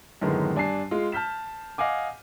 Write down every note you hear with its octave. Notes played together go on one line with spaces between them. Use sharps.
F#2 A2 D3 D#3 G#3 B3
G2 D4 G#5 A5 C7
G#3 F4
A5 F6 G6 B6 E7
D#5 F5 F#5 G#5 D6